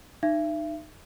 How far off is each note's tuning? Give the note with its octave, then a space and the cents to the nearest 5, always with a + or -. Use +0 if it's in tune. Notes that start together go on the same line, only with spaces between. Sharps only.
D#4 -25 E5 +35